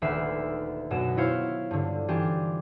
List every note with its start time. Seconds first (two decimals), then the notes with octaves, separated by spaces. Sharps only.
0.02 D#1 D2 B4 E5 F6 C7
0.90 F#2 B2 D#5 E7
1.17 E4 F4 C5 C#5 F5
1.71 G2 D3
2.08 E3 D4 F4 G4 G#4